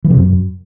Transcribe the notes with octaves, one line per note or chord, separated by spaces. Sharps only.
E3
C3
F#2